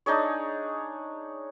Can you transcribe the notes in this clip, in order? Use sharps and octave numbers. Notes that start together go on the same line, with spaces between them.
D4 D#4 G#4 C#5